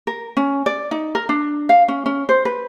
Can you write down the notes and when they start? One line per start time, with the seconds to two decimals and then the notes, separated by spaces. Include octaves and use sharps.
0.07 A#4
0.37 C#4
0.66 D5
0.91 D#4
1.15 A#4
1.29 D4
1.69 F5
1.88 C#4
2.06 C#4
2.29 C5
2.45 B4